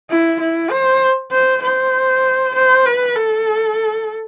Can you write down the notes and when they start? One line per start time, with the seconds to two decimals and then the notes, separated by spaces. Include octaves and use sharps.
0.10 E4
0.41 E4
0.71 C5
1.32 C5
1.62 C5
2.55 C5
2.86 B4
3.16 A4